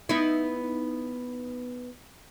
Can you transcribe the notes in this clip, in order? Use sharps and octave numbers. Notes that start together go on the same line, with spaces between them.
B3 D#4 E4